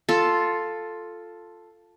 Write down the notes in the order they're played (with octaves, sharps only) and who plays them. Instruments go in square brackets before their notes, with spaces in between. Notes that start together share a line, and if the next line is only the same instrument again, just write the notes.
[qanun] F4 A4